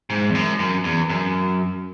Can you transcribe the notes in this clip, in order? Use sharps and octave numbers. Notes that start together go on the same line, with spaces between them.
G#2
E2
F#2
F#2
E2
F#2